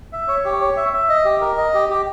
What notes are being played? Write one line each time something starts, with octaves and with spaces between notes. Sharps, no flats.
E5
C#5
G4
C#5
E5
E5
D#5
G4
A#4
D#5
G4
G4